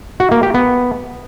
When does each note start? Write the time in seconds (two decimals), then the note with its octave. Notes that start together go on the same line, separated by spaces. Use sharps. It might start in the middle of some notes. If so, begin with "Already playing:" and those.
0.20 F#4
0.31 A#3
0.43 G4
0.54 B3